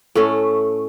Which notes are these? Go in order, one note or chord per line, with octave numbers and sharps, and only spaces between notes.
A2 A3 C#4